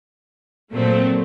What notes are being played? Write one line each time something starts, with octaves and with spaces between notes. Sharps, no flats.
A#2 F#3 A3 C4